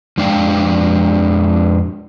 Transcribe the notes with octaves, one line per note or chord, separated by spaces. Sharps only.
F2 G#3 D4 D5 F5 G5